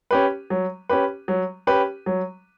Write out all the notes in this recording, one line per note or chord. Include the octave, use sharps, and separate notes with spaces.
C#4 G4 B4
F#3
C#4 G4 B4
F#3
C#4 G4 B4
F#3